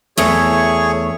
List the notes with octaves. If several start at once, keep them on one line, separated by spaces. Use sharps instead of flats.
E2 A3 G#4 C#5 C#6